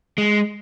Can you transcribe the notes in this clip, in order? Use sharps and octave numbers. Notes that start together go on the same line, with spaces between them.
G#3